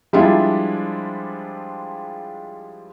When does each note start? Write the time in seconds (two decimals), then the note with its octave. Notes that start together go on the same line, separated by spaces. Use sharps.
0.13 F3 G3 G#3 D4 E4 F4